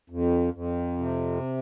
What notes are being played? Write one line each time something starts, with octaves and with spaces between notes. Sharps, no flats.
F2
F2
C3